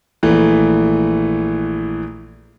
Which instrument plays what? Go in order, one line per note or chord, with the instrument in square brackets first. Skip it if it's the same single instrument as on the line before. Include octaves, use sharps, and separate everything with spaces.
[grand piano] A#1 E3 A3